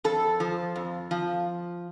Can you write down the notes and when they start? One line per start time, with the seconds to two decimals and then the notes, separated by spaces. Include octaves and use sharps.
0.04 F2 A4
0.40 F3
0.76 F2
1.11 F3